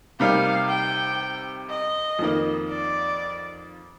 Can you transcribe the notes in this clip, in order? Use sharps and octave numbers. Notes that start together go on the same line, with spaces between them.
C3 G3 A#3 D#4 F5
G5
D#5
F2 D#3 A#3
D5